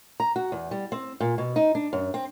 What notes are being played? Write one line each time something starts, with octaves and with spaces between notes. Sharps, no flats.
A#5
F#4
E2
G3
C4
A#2
B2
D#4
D4
F#2
C4